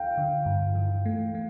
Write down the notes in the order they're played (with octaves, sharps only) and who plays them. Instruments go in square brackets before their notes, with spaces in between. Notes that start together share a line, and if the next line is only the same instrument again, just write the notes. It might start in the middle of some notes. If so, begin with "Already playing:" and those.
Already playing: [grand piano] F5 G5
[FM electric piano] D3
G2
E3
A3
A3